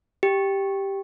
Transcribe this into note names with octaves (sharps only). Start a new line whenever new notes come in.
G4